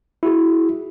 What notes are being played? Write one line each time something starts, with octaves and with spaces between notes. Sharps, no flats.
E4 F#4 G#4